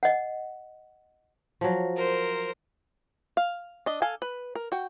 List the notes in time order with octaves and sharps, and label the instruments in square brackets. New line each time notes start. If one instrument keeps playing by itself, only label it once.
[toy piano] D#5 F#5
[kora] F3 F#3
[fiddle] A#4 C5
[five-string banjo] F5
D4 D#5
A4 F5 G#5
B4
A#4
F#4 G5